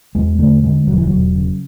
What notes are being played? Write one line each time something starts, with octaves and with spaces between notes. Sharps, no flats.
E2 G#3
D3 A3
D3 G#3
E1 F#3
E3
E1 F#3
C#3